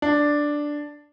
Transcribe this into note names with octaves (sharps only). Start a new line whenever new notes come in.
D4